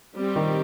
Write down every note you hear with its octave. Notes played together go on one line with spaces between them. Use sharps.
G3 C4 G4
D#3